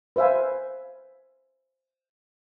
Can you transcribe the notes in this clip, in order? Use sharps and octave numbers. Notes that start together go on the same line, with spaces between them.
B4 C5 E5 F5 G#5